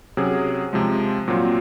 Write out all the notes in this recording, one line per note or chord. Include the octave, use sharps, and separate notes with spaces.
C3 F#3 C#4 G#4
C3 F3 G#3
A#2 F#3 C4 F4